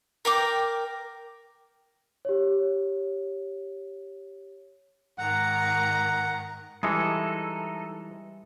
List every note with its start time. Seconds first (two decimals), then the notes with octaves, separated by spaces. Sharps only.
0.25 A#4 G5 D6
2.25 G4 C#5
5.18 G#2 D#3 F#5 A#5
6.83 E3 G3 G#3 D#4 A4 E5 D#6